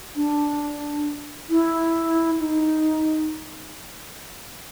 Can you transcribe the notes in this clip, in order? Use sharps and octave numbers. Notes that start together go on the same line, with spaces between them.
D4
E4
D#4